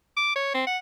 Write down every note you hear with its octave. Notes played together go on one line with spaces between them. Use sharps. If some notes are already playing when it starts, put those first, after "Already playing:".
D6
C#5
C4
F#5